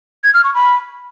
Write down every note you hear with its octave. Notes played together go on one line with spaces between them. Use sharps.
G#6
F6
C#6
B5